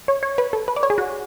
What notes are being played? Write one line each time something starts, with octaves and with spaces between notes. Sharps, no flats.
C#5
C#5
B4
A4
B4
D5
C#5
G#4
F#4